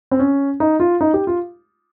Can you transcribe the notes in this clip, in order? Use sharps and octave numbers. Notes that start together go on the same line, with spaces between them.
C4
C#4
D#4
F4
D#4
G4
F4